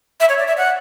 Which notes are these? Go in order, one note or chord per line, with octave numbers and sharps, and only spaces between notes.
E5
C#5
D5
E5
F#5